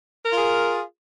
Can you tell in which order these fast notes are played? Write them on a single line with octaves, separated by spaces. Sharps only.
A#4 F4 G#4